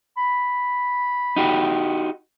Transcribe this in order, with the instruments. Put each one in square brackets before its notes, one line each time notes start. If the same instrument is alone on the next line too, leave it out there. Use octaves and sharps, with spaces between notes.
[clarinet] B5
[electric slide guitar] D#4 F#4 G4